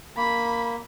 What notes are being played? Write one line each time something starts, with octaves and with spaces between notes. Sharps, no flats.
A#3 B5